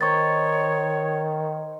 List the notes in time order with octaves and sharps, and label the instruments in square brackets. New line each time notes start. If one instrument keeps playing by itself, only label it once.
[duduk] D#3 [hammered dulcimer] D#4 C5 D#5 [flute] C#5 [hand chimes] C#6 A6